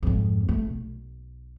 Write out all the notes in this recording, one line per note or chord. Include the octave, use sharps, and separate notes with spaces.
F2 G#2
A3
B1